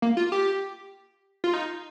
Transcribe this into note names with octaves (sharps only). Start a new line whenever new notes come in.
A#3
F4
G4
F4
D#4